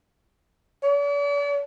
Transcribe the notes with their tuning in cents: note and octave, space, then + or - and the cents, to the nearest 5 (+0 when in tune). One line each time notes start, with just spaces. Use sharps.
D5 -45